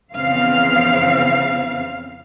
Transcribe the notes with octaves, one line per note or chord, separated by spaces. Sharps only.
F2 C#3 E3 B3 C4 F5